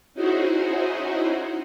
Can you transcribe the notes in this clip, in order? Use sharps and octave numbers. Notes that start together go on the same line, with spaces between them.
C#4 D#4 E4 F#4 G#4 C5